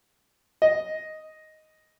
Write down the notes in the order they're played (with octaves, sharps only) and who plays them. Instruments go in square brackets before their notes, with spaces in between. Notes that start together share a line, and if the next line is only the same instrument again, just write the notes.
[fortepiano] D#5